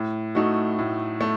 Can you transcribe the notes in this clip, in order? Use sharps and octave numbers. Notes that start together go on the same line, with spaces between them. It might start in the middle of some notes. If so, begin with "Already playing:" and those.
Already playing: A2
A3 D#4 F#4
A2
A3